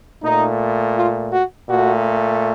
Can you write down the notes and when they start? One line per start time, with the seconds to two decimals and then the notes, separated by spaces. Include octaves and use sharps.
0.23 A#2 A3 D#4
0.97 F4
1.33 F#4
1.70 A#2 A3 F#4